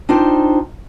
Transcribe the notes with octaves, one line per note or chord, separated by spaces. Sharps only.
D4 D#4 F4 C5 G5 A5